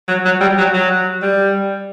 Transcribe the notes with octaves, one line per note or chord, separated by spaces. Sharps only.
F#3
F#3
G3
F#3
F#3
G3